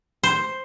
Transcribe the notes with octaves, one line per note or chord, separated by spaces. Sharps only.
C5